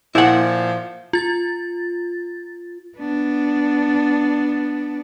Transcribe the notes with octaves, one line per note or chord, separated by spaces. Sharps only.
A#2 F3 E4 F#5
F4 A6
B3 D4